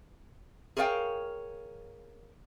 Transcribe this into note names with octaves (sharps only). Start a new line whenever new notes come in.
G#4 A#4 C#5 D5 F5 G5